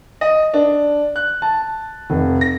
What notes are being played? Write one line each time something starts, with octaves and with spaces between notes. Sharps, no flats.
D#5
D4
F#6
A5
F1
A#6